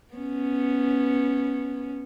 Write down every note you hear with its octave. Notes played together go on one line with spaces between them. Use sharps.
B3 C#4